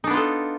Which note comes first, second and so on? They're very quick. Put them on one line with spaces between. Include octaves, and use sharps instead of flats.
D#4 D4 B3 F4 A4